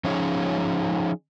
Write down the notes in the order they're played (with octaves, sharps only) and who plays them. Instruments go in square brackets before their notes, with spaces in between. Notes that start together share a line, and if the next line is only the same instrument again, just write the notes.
[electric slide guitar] F3 C#4 D#4 F4 G#4 C#5